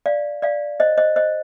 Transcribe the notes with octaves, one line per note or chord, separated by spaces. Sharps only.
D5 F5
D5 F5
C5 D#5
C5 D#5
C5 D#5